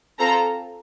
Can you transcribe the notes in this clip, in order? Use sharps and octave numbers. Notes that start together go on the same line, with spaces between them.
C4 F4 A4 A#5